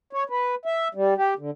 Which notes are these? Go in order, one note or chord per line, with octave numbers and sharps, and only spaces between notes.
C#5
B4
E5
G3
G4
D3